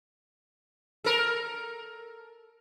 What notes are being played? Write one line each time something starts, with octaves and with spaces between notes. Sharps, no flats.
A4 A#4